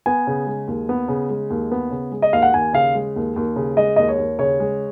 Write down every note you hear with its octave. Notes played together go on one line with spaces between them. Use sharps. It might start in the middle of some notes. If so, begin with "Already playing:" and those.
B3 G#5
C#3
G#3
D#2
B3
C#3
G#3
D#2
B3
C#3
G#3
D#5
D#2 F5
F#5
D#2 G#5
C#3 F5
G#3
D#2
D#2
C#3
G#3 D#5
D#2 D#5
C#5
D#2
C#3 C#5
G#3